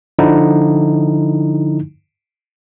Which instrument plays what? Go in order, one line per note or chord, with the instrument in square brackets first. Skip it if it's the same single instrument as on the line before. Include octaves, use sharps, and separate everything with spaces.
[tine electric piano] D3 F3 D#4 E4